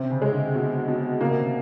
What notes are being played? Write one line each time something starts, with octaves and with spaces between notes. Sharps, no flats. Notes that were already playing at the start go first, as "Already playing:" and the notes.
Already playing: C3 C4 C#4
C#3
G#3
D3
B2
B2
C#3 A#3
C3
C#3